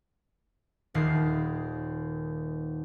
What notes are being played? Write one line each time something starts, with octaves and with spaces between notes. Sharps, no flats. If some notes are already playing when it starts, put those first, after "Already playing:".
D#1 D#2 C7